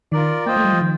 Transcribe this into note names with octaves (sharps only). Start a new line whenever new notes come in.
D#3 F4 A#4 D5
A#3 F4 C5 D#5 G5
A3
G3
F3
D#3